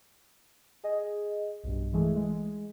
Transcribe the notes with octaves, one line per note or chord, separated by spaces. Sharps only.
G#4 D#5
B1 G2
E3 G#3 A3 G#4
G#3